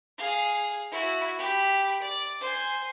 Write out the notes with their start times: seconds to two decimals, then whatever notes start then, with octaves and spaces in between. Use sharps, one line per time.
0.18 G#4 F5
0.91 E4 F#4
1.38 G4 B5
2.02 D5
2.40 C5 G#5